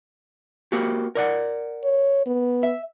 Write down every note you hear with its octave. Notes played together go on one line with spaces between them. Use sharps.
A#3 F#4 G4
A#4 D5 F#5
C#5
B3
E5